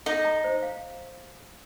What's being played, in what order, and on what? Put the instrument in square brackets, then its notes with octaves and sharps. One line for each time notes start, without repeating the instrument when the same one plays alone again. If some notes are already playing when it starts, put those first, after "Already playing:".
[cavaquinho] D#4 [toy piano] A4
[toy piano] A#5
C5
F5